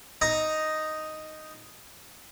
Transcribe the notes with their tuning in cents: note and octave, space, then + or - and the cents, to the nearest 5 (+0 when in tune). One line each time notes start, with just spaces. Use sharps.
D#4 +0 A#5 +0